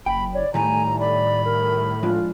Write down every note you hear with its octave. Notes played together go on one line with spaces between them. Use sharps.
F#1 G5 B5
C#5 D5
A2 D#3 G3 A3 G#5 A#5
D5 B5
A#4
F3 G#3 D4 F4